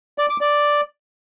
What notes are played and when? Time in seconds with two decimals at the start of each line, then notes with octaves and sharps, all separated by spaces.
0.18 D5
0.30 D6
0.41 D5